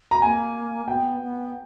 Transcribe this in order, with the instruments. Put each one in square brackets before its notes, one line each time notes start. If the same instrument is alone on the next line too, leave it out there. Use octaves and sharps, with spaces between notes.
[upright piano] A#5
[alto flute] A#3 [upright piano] G#5
[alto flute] B3 [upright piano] G5
[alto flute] B3